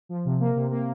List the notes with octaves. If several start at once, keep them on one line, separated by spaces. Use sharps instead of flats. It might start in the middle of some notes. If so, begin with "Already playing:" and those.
F3
C3
A#3
C3
A#3